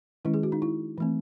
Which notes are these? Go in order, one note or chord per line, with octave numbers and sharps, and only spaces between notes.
D#3 G#3 C#4 E4
G#4
F#4
D#4
E4
E3 A3 C4